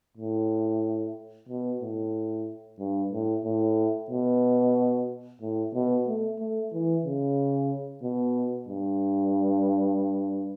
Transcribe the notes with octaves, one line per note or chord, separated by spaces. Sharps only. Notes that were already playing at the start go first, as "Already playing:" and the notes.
A2
B2
A2
G2
A2
A2
B2
A2
B2
A3
A3
E3
C#3
B2
G2